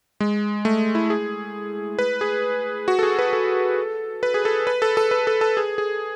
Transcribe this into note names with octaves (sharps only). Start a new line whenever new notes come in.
G#3
A3
E4
G#4
B4
G#4
F#4
A4
G#4
B4
A4
B4
G#4
A4
B4
A4
A4
B4
A4
A4
G#4
G#4